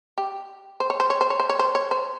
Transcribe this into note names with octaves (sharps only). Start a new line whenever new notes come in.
G4
C5
C#5
C5
C#5
C5
C#5
C5
C#5
C5
C#5
C5